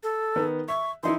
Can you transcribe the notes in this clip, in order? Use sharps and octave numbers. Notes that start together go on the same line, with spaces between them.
A4
D#3 B3
E5 C#6
E3 D#4 E4 C6